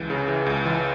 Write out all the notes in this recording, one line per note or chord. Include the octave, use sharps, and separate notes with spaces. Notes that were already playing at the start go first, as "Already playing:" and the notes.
Already playing: C#2 E3
C#3
E3
C#2
E3